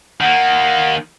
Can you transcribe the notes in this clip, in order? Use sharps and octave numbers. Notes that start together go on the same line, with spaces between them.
D#3 A#3 F#5